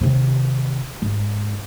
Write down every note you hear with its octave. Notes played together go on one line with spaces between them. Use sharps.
D#2 C3
G#2